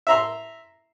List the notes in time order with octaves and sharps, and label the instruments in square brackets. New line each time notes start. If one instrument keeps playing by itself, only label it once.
[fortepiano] E5 A#5 C6